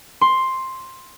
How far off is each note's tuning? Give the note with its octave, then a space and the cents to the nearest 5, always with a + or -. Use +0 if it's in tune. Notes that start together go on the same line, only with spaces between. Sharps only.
C6 +5